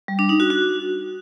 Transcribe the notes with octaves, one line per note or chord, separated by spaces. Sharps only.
G3
D4
D#4
F#4
F#4